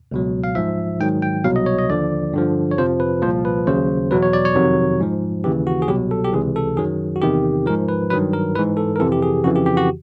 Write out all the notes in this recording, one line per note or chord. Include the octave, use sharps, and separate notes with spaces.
C#2 B2 F#3
F5
G#2 F3 E5
G#2 D#3 F#3 G5
G5
C2 B2 F#3 F5
D#5
C#5
D#5
D#2 D3 F3 D5
G2 D3 F3
C#5
F2 C3 F3 C5
B4
C2 A#2 F3 C5
B4
D#2 C#3 F#3 C5
E2 B2 F#3 B4
C#5
D5
C#5
F2 C3 D#3 F#3
G#2 F3
D#2 C#3 E3 G4
F#4
G#4
C2 B2 F#3 G4
A4
G4
C#2 C3 E3 G#4
A4
F#2 D#3 F#3 G#4
F#4
E2 C3 D#3 G4
G#2 F3 A#4
B4
G2 D#3 F#3 B4
A#4
G#2 E3 B4
A4
A#4
F2 C3 E3 A4
G4
G#4
F2 C#3 E3 F#4
G4
G4
F#4